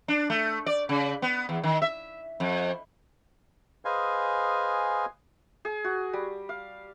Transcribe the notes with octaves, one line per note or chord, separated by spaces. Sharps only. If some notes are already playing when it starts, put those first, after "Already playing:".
D4
A3
D5
C#3
B3
E2
D#3
E5
F2
G#4 B4 C5 D#5 F5 G#5
G#4
F#4
G3
F5